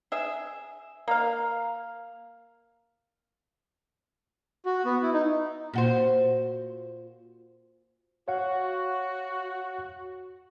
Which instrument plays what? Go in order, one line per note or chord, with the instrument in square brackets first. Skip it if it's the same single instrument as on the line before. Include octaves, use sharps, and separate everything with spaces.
[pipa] G#4 E5
A#3 F5
[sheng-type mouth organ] F#4
B3
E4
D#4
[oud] A#2 F#4 C5
[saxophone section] F#4 [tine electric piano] C#5 F5 F#5